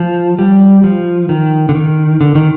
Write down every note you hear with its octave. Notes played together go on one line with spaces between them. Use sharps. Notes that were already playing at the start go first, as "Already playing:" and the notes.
Already playing: F3
G3
F3
D#3
D3
D#3
D3
D#3